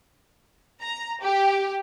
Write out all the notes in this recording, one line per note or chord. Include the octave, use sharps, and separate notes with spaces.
A#5
G4